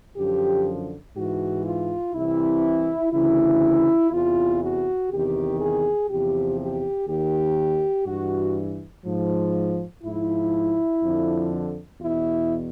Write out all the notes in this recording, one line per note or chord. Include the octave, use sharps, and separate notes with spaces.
F#2 D3 F3 G4
G#2 E3 F#4
F4
C2 C3 E3 E4
D2 C#3 E3 E4
E2 C3 E3 F4
F#4
E2 C3 D#3 G4
G#4
E2 C3 F3 G4
G4
D#2 D#3 G4
G2 E3 F#4
G#2 F3
G#2 F3 E4
F2 D3 F3
E2 B2 E4